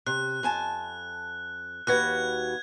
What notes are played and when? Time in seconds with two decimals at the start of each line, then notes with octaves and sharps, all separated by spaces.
0.07 C3 F#6
0.43 F2 G#5 A5
1.87 D#2 F#4 B4 F#6 G#6